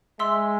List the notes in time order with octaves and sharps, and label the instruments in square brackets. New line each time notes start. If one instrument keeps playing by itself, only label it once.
[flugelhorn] G#3 [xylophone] E5 C6 E6